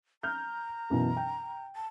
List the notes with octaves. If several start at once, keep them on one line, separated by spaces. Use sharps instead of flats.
A#5 F6 G6
F#2 B2 E3
G5
A5